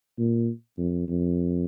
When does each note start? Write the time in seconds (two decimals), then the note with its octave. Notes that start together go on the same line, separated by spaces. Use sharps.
0.18 A#2
0.78 F2
1.08 F2